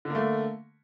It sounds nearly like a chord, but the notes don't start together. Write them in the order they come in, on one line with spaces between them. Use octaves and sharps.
D3 A#3 A3